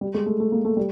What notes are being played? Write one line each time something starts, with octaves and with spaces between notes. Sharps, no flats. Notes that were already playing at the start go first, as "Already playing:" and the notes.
G3
G#3
A3
A3
A#3
A3
G3